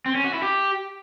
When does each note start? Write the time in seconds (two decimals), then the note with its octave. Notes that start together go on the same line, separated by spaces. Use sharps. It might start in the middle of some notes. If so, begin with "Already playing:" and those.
0.06 C4
0.15 C#4
0.24 F#4
0.33 E4
0.43 G4